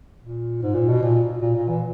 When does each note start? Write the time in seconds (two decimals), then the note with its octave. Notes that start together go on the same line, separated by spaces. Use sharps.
0.22 A#2
0.62 G#2
0.75 A#2
0.88 B2
1.02 A#2
1.42 A#2
1.56 A#2
1.68 E3